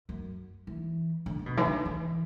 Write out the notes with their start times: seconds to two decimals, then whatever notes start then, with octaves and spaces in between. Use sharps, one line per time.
0.09 F#2
0.67 E3
1.26 D3
1.39 D3
1.46 B2
1.57 E3
1.66 D3
1.85 E3